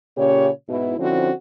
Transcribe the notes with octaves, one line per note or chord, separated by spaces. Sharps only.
A#2 C#3 C#4 G4 C#5
G#2 B2 E4
D3 F3 C4 C#4 E4 F#4